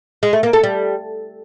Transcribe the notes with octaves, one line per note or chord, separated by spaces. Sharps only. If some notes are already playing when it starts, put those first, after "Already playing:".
G#3
A3
A#3
A4
G3